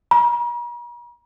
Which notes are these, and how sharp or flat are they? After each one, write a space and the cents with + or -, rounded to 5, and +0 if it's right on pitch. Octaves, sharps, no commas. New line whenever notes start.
A#5 +45